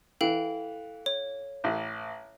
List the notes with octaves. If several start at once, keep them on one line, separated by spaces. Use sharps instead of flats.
E3 A4 F5 G5
C#5
A1